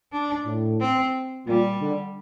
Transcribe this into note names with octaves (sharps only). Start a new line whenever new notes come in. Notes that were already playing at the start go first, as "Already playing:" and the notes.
D4
A2
C4
A#2 G3
D3